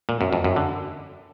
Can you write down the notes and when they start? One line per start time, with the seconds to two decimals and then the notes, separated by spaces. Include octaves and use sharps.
0.09 A#2
0.21 F#2
0.33 F2
0.44 F#2
0.56 D3